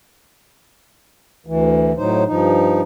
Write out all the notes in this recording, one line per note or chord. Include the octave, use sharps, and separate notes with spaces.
D2 E3
A2 F#3 D#4 C5
G2 F3 D#4